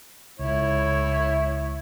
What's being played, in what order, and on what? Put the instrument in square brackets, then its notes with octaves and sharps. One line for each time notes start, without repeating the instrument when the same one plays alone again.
[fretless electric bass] C#2 [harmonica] E4 C#5